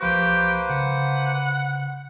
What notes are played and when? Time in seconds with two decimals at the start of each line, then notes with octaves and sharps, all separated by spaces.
0.01 C2 F3 A#3 G4 B4 C5 C#6
0.70 C#3 F#5